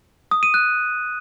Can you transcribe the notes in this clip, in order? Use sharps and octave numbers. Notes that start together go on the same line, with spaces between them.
D#6
D#7
F#6